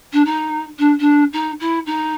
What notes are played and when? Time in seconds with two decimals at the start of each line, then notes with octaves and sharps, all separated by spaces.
0.13 D4
0.25 D#4
0.78 D4
0.99 D4
1.32 D#4
1.59 E4
1.86 D#4